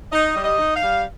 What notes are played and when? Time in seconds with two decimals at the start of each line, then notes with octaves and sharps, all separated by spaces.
0.12 D#4 D#5
0.36 G3
0.44 D#5
0.59 D#4
0.75 F5
0.82 G3